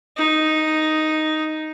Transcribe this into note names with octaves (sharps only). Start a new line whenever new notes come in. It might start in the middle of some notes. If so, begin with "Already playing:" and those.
D#4